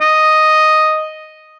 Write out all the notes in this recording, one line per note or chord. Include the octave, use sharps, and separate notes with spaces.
D#5